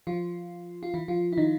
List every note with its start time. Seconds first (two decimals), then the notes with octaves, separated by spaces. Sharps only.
0.07 F3 F4
0.83 F4
0.94 E3 E4
1.08 F3 F4
1.33 E4
1.37 D#3 D#4